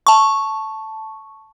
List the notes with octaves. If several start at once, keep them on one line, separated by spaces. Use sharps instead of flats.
A5 C#6